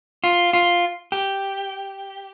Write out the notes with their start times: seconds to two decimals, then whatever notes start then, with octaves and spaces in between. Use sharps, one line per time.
0.24 F4
0.53 F4
1.12 G4